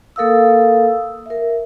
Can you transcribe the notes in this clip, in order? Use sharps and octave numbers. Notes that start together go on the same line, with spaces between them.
A#3 A4 A#4 F5 D#6 E6
A#4 E5